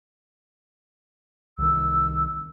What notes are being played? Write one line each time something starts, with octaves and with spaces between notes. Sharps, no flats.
C2 D#3 E6